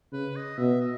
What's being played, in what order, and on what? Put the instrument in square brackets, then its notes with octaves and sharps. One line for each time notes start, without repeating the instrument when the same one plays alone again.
[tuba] C#3 [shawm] B4
[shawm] D#5
[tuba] B2 [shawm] E5
[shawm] D#5